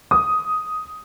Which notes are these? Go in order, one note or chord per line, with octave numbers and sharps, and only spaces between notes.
D#6